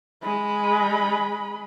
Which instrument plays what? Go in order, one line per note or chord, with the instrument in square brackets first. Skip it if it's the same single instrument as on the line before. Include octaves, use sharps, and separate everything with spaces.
[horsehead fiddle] G#3 B5